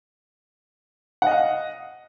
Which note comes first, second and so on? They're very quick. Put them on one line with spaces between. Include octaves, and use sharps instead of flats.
F#5 D#5 F5